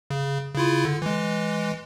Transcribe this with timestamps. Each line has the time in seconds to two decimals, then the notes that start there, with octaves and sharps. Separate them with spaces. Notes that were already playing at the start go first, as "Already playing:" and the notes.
0.10 C#3
0.55 C#3 E4 F4
0.85 D3
1.02 E3 G#3